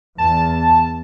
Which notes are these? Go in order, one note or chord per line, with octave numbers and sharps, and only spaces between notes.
E2 A5